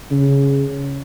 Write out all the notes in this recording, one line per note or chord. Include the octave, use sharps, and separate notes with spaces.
C#3